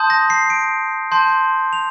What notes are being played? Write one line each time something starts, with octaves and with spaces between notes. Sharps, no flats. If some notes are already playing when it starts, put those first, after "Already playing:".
Already playing: A5 C6 D#6 G6
A#6
C7
D7
A5 C6 G6
F7